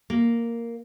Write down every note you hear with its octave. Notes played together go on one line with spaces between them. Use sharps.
A#3